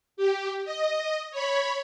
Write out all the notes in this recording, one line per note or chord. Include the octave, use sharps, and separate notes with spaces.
G4
D#5
C#5 B5